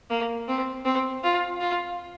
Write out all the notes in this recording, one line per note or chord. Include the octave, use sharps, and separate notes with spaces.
A#3
C4
C4
F4
F4